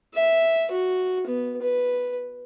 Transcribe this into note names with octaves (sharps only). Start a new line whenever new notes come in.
E5
F#4
B3
B4